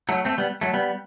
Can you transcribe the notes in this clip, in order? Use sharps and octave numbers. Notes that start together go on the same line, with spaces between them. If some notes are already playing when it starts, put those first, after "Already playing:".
F#3 A3
A3 C4
G3 B3
F#3 A3
G3 B3